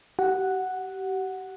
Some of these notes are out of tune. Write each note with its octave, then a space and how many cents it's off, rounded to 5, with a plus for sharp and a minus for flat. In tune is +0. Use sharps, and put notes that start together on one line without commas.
G4 -35 F#5 +0